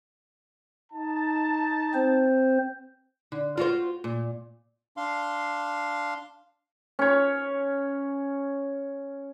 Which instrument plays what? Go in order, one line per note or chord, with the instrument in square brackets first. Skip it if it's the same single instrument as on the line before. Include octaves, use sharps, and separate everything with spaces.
[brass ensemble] D#4 A5
[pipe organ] C4 C5
[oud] D3
F4 F#4 C5
A#2
[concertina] D4 F5 C6
[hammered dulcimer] C#4 C#5